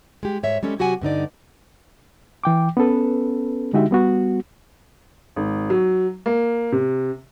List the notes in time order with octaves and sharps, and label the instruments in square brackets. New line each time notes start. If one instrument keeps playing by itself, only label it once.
[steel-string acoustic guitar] G#3 G4
G#2 C#5 E5
G3 G#3 C#4 A4
C3 F#3 F#4 G4 F#5 G#5
G2 D3 D#4 D5
[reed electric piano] E3 G5 D6
B3 C#4 A4 B4
D3 G#3 D#4 F#4 G4 E5
G3 B3 F#4
[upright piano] G#1
F#3
A#3
C3